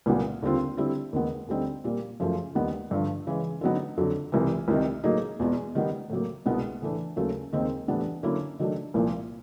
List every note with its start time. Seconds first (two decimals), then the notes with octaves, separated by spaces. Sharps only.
0.06 C2 A#2 F#3 B3
0.42 D#2 D3 G3 C4 F4
0.77 D3 G3 C4 E4 G4
1.13 D#2 D#3 G#3 B3
1.48 D2 D3 G3 C4 D#4
1.84 A#2 G3 A#3
2.20 F#2 C#3 F3 A3
2.55 D#2 D#3 G3 B3
2.91 G2 D3 F3
3.27 C#3 E3 G#3
3.61 D3 F#3 B3 D#4
3.98 F2 D3 F#3
4.32 C2 C3 E3
4.68 C2 C3 D#3
5.04 A2 F#3 A#3 D#4 G#4
5.39 E2 B2 G#3
5.75 D#3 G3 B3
6.10 A2 F#3 A#3
6.46 C2 B2 G#3 B3
6.82 A2 E3 A3 D4
7.16 D#2 C#3 F#3 A3 C#4
7.53 D#2 D#3 G#3 C4
7.88 A2 E3 G3 B3 D4
8.23 D3 F#3 A#3 C#4 E4
8.59 D#3 F#3 A3 D4
8.94 C2 A#2 F3 A#3